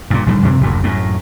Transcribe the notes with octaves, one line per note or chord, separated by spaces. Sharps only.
G2 A#2
A#1 D3 D#3 G3
F#2 C3 C4
F#1 D2 A#2
F#2 A2